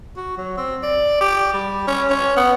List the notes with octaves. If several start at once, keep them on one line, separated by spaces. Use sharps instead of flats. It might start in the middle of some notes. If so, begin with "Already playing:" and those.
F#4
F#3
C4
D5
G4
G3
C#4
C#4
B3